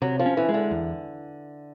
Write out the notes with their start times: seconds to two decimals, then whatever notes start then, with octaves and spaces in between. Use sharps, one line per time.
0.02 C3 F#3
0.19 F3
0.26 C#4
0.37 E3
0.49 G#3
0.54 D3
0.71 E2